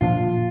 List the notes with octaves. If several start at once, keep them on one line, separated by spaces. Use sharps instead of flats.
A#2 F3 A#3 D4 F4